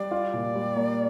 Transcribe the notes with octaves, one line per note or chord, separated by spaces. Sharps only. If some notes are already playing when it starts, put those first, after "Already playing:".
Already playing: G3 D5
F4
A#2
G3
A#3